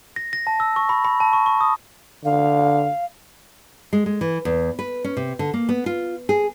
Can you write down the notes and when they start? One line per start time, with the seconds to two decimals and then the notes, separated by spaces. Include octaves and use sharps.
0.16 A#6
0.33 A#6
0.47 A5
0.60 E6
0.76 C#6
0.89 B5
1.05 B5
1.20 A5
1.33 C#6
1.46 C#6
1.61 D#6
2.24 D3 F5
3.93 G#3
4.06 G#3
4.21 E3
4.45 E2
4.79 B4
5.04 C#4
5.17 C3
5.39 D3
5.54 A#3
5.69 B3
5.86 F4
6.29 G#4